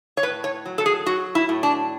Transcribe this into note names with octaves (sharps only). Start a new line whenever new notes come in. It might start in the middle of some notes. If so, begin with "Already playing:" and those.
C#5
A2 B4
C#5
F#3
A4
G#4
F#3 F#4
E4
A2
D4